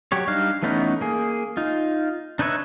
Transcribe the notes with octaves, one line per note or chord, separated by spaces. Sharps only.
F#3 G4 C#5
G3 D4 D#4 F5
E3 A3 B3 C#4 D#4
A#3 G#4
D#4 F4
D4 D#4 B4 C#5 E5